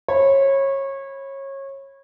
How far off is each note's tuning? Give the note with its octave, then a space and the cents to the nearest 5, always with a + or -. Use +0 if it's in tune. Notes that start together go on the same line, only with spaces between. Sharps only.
C#5 -25 B5 +0